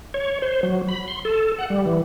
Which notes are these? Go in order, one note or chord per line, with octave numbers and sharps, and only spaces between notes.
C#5
C5
F#3
B5
C6
A4
F#5
G3
E3